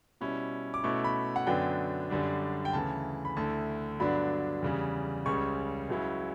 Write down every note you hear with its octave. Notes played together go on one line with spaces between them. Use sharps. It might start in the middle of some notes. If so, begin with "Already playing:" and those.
B2 G3 C#4 E4
D6
B2 A3 C#4 E4 C#6
B5
F#5
F#2 D3 F#3 B3 D4 G5
F#2 D3 G3 D4
G5
D2 C#3 E3 A5
B5
D2 D3 A3 E4 A5
G2 D3 F#3 B3 D4 B5
E2 C#3 G3
C#2 C#3 G3 C#6
C#2 C#3 F#3 C#4 E4